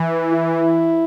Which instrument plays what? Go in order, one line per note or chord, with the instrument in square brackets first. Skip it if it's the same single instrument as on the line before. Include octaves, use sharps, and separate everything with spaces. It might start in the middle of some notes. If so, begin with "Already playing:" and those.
Already playing: [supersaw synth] E3
[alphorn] E4